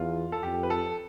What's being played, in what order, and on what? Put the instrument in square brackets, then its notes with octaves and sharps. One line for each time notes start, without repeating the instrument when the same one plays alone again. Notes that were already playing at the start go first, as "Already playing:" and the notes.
Already playing: [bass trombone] E2 [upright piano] F4
[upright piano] A4
[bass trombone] F2 [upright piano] G4
[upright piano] B4
A4